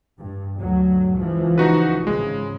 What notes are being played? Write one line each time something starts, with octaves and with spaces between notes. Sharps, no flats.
G2
D2 G2 F#3
C#2 E3 F3
D#4 F#4 B4
G#1 C#3 G#3